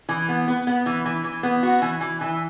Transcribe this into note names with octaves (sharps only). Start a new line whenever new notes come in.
E3
B3
B3
B3
E3
E3
E3
B3
F#4
E3
E3
E3